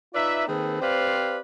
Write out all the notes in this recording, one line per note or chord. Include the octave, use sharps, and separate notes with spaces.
D#4 F4 B4 D5 E5
D#3 A#3 C4 G#4 A4 B4
C4 G4 B4 C5 D5 F5